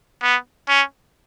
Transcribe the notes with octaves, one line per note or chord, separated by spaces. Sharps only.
B3
C#4